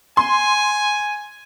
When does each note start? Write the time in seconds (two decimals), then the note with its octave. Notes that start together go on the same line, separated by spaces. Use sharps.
0.17 G#5 C6